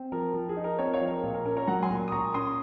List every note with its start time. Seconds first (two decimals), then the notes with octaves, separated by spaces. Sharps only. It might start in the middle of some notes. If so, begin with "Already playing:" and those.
Already playing: C4
0.12 F3 A#4
0.34 F3
0.49 G#4
0.56 D#4
0.64 A#4
0.79 C4 A#4 C#5
0.94 C#5 F5
1.01 F3
1.09 A#4
1.23 A#2
1.34 A#4
1.45 C#4 A#4
1.57 A#4 C#5
1.67 F#3 F#5 A#5
1.83 G#5 C6
1.90 A#2
2.08 D#6
2.12 A#2 A#5 C#6
2.34 C#4 C6 D#6